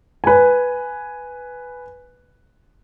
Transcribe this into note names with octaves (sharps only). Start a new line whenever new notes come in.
B4 G#5